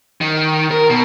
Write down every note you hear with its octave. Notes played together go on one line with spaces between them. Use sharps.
D#3
A#4
B2